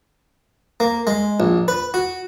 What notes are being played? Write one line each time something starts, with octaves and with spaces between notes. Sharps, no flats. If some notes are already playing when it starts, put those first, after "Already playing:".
A#3
G#3
A#1
B4
F#4